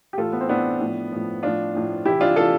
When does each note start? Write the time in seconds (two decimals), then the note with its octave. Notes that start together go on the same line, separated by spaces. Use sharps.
0.13 G4
0.18 A2 E3 F4 A4
0.32 B3
0.41 C4
0.49 A2 E3 B3 D4
0.81 A2 F3
1.12 A2 F3
1.43 A2 F3 D4 F4
1.75 A2 F3
2.05 C3 E3 E4 G4
2.21 D4 F4
2.36 C3 E3 F4 A4